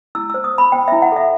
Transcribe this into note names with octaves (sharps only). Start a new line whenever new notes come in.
E4 E6
C5 E6
D#6
C5 B5
C5 G5
E4 E5
F#5
A4 E5